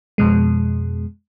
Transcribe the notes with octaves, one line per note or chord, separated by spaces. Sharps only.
F2 B2 G#3